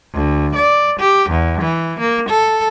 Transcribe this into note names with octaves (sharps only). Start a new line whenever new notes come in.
D2
D5
G4
E2
E3
A#3
A4